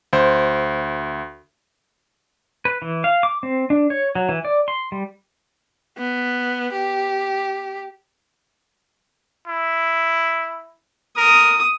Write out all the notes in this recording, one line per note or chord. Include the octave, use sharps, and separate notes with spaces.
D2 C5
B4
E3
F5
D6
C4
D4
C#5
F#3
E3
D5
C6
G3
B3
G4
E4
A#4 D#6